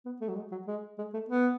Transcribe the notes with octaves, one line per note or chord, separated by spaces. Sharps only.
B3
A3
F#3
G#3
F#3
G#3
G#3
A3
B3